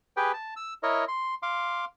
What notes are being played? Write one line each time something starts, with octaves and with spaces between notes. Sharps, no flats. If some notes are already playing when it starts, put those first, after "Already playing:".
G4 G#4 B4 G5
A5
E6
E4 A#4 C#5 D#5
C6
F5 C6 D6